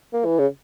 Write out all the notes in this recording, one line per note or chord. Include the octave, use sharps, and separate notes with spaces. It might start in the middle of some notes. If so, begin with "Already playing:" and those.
A#3
E3
C#3